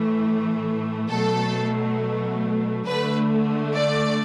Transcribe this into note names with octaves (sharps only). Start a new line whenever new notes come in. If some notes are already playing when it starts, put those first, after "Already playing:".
Already playing: A2 E3 A3
B2 F#3 A3 A4
D3 A3 B4
D5